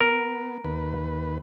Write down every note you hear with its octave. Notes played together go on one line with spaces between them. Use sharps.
B3 A#4
D#2 B4